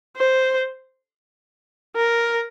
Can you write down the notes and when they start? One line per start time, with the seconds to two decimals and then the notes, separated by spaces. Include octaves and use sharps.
0.16 C5
1.96 A#4